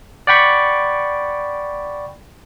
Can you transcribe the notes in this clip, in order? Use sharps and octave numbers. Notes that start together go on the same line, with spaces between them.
D5 F#5 G5 B5 C#6